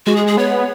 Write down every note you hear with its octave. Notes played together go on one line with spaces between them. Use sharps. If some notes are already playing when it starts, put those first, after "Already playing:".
G#3 F#4
G#4
G#4
B3 C#5